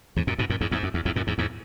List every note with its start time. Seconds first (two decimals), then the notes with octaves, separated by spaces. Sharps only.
0.16 E2 G#2
0.27 F#2 A#2
0.38 G#2 B2
0.50 F#2 A#2
0.61 E2 G#2
0.71 E2 G#2
0.83 F#2
0.94 E2
1.05 E2 G#2
1.16 F#2 A#2
1.27 E2 G#2
1.38 E2 G#2